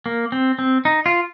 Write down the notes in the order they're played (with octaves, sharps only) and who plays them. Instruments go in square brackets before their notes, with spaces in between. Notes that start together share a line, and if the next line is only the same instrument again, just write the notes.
[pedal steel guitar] A#3
C4
C4
D#4
F4